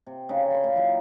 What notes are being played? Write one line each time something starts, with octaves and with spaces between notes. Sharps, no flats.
C3
C#3 D#4 F#4 D5
B5 C6
A#2 F4 F5 B5
F#3 D#4 E4 G4